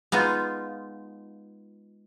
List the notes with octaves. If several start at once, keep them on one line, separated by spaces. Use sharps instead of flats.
G#3 B3 D#4 F4